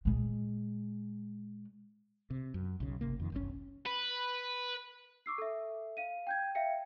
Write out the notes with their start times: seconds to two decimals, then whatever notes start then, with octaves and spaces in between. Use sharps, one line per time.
0.05 A#2 G#3
2.30 C3
2.54 F#2
2.80 B1 C#3
3.01 G1 C3 A#3
3.20 F2 D#3
3.32 F#1 B1 C3 C#4
3.86 B4
5.26 C#6 D6 E6 C7
5.38 A4 E5
5.97 F5 D#7
6.27 G5 G6 G#6
6.55 E5 F5 G5 C#7